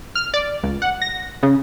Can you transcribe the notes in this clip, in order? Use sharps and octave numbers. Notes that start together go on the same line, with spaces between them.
F6
D5
C#2
F#5
A#6
C#3